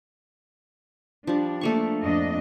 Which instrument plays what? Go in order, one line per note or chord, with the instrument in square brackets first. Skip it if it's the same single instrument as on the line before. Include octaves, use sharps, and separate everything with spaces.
[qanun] F3 G3 [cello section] D4
[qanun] A3 A#3 C#6
[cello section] F2 D4 D#5